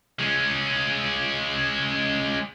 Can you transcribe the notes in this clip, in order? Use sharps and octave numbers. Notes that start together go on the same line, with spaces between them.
G#3 C#4